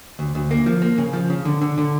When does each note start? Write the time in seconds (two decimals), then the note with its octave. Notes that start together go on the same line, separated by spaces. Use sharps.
0.19 D2
0.35 D2
0.51 A#3
0.66 F3
0.82 A#3
0.98 C#3
1.13 F3
1.30 C#3
1.45 D3
1.61 D3
1.78 D3